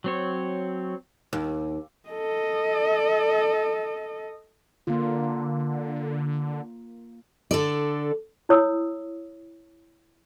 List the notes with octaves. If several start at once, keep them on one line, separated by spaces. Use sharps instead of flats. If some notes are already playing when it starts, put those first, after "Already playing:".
F#3 C4 C#5
D#2
A4 D#5
D3 A#3 F4
D3 A4 D5
E4 C#5 D#6 E6